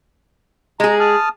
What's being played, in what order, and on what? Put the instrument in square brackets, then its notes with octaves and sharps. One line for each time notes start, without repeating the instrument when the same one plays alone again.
[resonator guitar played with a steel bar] G#3 G#4 [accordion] A#5
[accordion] A5 D#6 F6